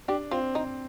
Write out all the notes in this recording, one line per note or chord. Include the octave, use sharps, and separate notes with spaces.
D4 G4
C4 F4
C4 D#4